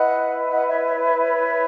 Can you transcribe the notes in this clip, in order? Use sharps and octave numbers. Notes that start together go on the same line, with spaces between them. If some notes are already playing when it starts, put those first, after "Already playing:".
Already playing: E4 B4 D#5 F#5
D#5 F#5
C#5 E5
C#5 E5
C#5 E5
C#5 E5